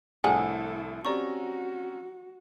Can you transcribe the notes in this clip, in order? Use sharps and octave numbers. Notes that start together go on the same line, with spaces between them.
C2 A2 F3 D4 E4 G#4 A4 F#5
C4 C#4 F#4 G4 D5 A#5 C#6